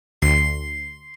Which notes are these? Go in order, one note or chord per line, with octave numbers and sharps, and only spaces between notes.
D2 C6